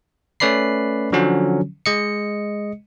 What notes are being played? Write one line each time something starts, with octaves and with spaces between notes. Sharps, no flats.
A3 C#4 B4 D5 B5 C7
D3 F3 F#3 C#4
G#3 D#5 C#7